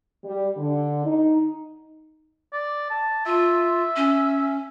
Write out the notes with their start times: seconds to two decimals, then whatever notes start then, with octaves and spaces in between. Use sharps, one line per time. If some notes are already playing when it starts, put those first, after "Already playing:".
0.25 G3
0.57 D3
1.06 D#4
2.53 D5
2.91 A5
3.26 F4 E5
3.96 C#4